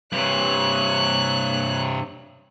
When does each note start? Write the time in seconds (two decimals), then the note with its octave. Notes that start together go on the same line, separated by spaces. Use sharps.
0.12 G2 C3 C#5 F#6